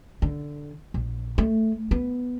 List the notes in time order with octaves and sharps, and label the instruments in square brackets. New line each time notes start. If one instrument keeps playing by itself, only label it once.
[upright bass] D3
A#1
A3
B3